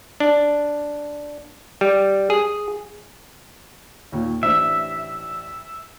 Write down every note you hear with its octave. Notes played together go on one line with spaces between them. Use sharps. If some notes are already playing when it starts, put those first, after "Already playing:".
D4
G3
G#4
D#2 A#2
A1 D4 C5 E5